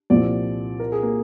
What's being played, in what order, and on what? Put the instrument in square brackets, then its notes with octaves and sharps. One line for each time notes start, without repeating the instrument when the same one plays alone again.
[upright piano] C2 A#2 F3 C4 [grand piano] D5
[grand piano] A#4
G#4
A#3